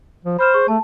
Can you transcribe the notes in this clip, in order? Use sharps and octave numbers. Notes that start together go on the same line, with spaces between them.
F3
C5 B5 F6 E7
G#4 C#6
A3 A5